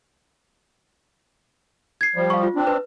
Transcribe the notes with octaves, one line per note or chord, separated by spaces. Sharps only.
G#6 C7
F3 G3
F5 C#6
F4
C4 D4
B4